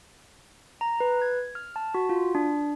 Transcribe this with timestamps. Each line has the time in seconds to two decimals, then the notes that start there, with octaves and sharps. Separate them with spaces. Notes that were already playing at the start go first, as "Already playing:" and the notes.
0.81 A#5
1.00 B4
1.22 G#6
1.55 F6
1.76 A5
1.95 F#4
2.09 F4
2.35 D4